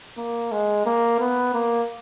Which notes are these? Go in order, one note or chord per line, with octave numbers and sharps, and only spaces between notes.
A#3
G#3
A#3
B3
A#3